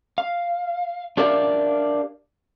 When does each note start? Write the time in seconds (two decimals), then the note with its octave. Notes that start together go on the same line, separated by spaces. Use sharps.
0.18 F5
1.17 D4 G4 A#4 D5 E5 F5